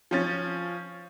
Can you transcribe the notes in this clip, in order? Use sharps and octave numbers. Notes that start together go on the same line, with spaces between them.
F3 C#4 A6